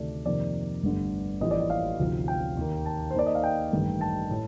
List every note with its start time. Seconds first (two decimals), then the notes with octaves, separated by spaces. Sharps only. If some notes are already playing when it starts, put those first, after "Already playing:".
Already playing: D2 C3 D#3 A3 D5
0.26 F2 C3 D#3 A#3 D5
0.83 G1 G2 D3 A3
1.41 A1 A2 F3 A#3 D4 D#5
1.51 D5
1.60 D#5
1.70 F5
1.99 D2 C3 F3 C4 D#4
2.28 G5
2.57 D#2 D#3 A#3
2.86 A5
3.11 C5
3.14 D#2 D#3 A#3 D#4 D5
3.26 D#5
3.35 F5
3.43 G5
3.72 A1 G2 D#3 A3
4.01 A5
4.31 A2